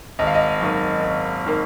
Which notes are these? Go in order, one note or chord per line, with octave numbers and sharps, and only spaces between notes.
G#1 D#5
F5
D#5
F#2 D#3 A#3
G#1
D#3 A#3